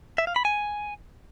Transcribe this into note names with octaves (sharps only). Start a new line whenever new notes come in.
E5
F5
B5
G#5